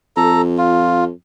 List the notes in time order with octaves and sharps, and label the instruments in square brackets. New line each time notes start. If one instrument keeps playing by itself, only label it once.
[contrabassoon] F2 [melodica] A4 A#5
[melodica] F4